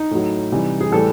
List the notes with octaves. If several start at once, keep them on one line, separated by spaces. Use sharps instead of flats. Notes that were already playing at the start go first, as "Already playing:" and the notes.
Already playing: D#4
A2 F#3
C3 E3 G3
G#4
A2 E3 G3 A4